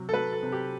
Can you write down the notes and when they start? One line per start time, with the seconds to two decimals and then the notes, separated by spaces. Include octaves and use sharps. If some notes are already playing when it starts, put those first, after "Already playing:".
Already playing: C3 F#3
0.09 A4
0.13 F#3 B4
0.32 A4
0.43 C3
0.52 G4